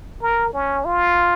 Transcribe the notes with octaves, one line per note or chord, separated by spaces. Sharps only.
A#4
C#4
F4